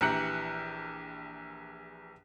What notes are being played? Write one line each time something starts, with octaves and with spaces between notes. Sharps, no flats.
A#1 E3 G4 A#5 F#6 C#7